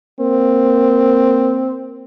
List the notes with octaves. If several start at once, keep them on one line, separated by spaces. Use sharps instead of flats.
A#3 C4